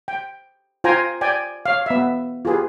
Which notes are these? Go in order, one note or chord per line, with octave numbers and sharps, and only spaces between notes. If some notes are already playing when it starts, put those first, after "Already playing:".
G5
F4 C5 G5 G#5 A#5
D5 G5 G#5
C#5 F5
B3 E5
F4 G4 G#4 B4